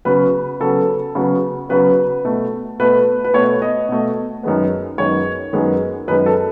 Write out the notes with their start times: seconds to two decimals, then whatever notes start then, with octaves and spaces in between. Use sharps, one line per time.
0.05 C#3 F#3 B3 B4
0.60 C#3 F#3 B3 A4
1.15 C#3 F#3 B3
1.69 C#3 F#3 B3 B4
2.25 B2 A3
2.79 B2 A3 B4
3.25 B4
3.33 B2 A3 C#5
3.62 D#5
3.89 B2 A3
4.43 F#2 D#3 G#3 B3
4.98 F#2 D#3 G#3 B3 C#5
5.53 F#2 D#3 G#3 B3
6.08 F#2 D#3 G#3 B3 B4
6.26 A4